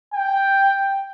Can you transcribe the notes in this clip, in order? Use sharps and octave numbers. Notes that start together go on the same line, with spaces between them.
G5